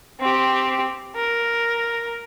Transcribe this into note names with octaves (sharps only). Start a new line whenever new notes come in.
C4 G4
A#4